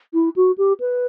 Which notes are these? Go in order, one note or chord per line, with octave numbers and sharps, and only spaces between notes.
E4
F#4
G4
B4